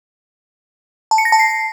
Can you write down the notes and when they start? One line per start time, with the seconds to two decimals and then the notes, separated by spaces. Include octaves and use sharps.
1.11 A5
1.18 C#7
1.25 A#6
1.32 A5
1.39 C7